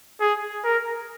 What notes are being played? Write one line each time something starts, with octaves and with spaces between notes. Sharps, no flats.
G#4
A#4